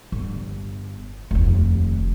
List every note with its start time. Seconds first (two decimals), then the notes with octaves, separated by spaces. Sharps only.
0.12 G1
1.31 F1 D#2